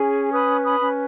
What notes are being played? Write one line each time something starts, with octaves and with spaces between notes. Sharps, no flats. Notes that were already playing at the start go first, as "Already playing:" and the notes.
Already playing: C#4 G#4
B4 B5 D#6
B5 D#6
C#4